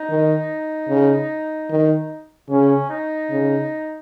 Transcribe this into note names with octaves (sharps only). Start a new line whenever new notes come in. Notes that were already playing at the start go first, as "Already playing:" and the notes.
Already playing: D#4
D#3
C#3
D#3
C#3 C#4
D#4
C#3